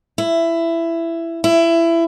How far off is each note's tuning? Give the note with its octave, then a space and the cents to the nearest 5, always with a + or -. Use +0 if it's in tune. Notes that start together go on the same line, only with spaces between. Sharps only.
E4 +15
E4 +20